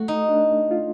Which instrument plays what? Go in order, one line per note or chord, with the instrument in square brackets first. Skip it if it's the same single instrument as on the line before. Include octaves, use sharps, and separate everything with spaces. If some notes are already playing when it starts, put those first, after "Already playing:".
Already playing: [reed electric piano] A3 A4 [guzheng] F#4
[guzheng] D#4
[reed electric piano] D4
F4